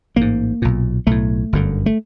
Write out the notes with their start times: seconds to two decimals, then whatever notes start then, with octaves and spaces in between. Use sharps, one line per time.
0.16 A1 G#2 A#3
0.62 B1 A#2
1.07 B1 A2 A3
1.53 G1 F#2 D3
1.86 A3